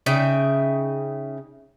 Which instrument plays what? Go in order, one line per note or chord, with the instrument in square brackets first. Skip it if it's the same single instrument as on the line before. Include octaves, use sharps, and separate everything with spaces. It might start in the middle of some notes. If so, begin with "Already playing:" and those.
[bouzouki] C#3 D#4 E5 G5